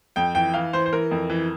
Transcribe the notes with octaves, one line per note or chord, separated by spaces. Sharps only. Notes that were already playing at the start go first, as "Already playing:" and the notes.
F2 G5
E3 G5
E3 F5
E3 C5
C5
E3 A#4
F2
E3